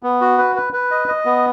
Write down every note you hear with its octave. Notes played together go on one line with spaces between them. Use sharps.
B3
F#4
B4
B4
B4
D#5
D#5
B3